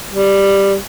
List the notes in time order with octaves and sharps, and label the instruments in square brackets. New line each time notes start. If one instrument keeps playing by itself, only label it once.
[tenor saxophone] G3